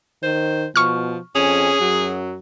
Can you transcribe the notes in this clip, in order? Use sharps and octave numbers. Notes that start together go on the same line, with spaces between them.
D#3 C5
B2 F3 C#6 F6
F2 C#4 G#4
F#2 F#3